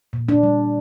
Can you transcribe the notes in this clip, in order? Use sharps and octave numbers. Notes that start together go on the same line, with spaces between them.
A#2
D4
G3